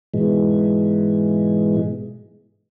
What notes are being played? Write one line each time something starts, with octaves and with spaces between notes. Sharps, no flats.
G#2 B2 E3 G#3